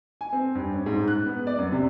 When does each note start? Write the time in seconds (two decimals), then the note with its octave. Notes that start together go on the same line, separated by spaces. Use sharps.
0.21 G#5
0.33 C4
0.55 G2
0.74 C#4
0.86 G#2
1.08 F#6
1.26 B3
1.47 D5
1.58 F#2
1.72 C3